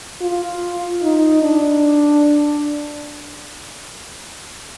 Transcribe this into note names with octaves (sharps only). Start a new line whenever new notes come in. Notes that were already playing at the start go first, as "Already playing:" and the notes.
F4
D#4
D4